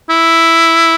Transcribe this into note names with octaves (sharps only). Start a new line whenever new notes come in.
E4